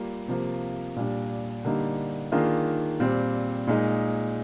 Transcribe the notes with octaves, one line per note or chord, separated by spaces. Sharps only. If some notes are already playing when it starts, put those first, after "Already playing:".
Already playing: G3 A#3 F4
C3 F3 A#3
A#2 G3 D4
D3 G3 A#3 D#4
D#3 A#3 D4 F4 G#4
A#2 G3 C4
A#2 G#3 D#4